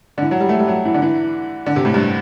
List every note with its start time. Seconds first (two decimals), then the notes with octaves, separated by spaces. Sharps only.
0.18 D3
0.22 E3
0.31 F#3
0.40 G3
0.49 A3
0.59 G3
0.68 F#3
0.85 E3
0.94 D3
1.02 E3
1.66 D3
1.76 C3
1.85 A2
1.94 G2